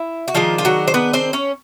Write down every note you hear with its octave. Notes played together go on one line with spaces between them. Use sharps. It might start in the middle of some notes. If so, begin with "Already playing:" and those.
Already playing: E4
F#4
D#3 F3 G#3 D4 F4
F4
F#3 F#4
C5
B3 B4
C4 C5
C#4 C#5